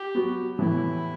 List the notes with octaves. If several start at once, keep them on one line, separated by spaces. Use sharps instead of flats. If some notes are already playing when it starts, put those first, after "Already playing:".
Already playing: G4
F#3 B3 F#4
A2 E3 B3 E4